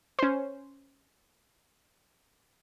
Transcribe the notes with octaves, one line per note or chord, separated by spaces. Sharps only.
C#4 C5